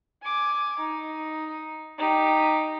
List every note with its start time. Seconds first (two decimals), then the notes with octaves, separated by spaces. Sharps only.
0.22 G#5 D6
0.79 D#4
1.98 D#4 G4